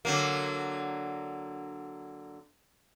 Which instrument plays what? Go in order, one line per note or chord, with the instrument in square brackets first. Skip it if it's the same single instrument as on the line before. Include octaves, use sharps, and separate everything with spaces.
[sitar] D3 F#3 A#3